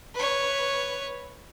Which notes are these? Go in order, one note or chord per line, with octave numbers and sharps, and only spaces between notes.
B4 C#5